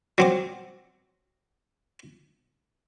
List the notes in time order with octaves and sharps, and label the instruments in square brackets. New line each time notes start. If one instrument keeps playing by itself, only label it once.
[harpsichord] F#3 C4 D6